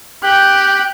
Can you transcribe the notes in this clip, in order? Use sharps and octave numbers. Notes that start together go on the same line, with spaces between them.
G4 G5 F#6